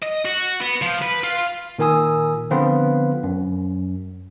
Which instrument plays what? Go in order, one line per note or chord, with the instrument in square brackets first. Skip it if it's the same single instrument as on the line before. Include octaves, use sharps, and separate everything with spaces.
[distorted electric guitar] D#5
F#4
B3
F3
B4
F4
[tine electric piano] A#2 D#3 A#4 G#5 D#6 E6
D3 F3 B3 C4 F4 B4
F#2